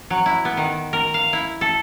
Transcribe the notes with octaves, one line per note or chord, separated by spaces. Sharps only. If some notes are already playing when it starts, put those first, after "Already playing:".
F#3
E4
B3
D#3
A#4
F5
E4
A4